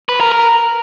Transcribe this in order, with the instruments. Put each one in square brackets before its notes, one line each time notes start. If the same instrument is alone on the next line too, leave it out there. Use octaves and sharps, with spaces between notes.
[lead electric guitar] B4
A#4
A#4